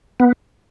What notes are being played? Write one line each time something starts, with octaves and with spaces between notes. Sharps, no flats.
B3